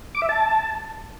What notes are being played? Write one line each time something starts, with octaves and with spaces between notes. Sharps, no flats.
D6
E5
A5